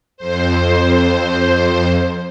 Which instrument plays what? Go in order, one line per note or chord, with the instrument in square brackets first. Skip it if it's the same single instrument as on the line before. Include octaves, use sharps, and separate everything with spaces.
[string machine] F2 C5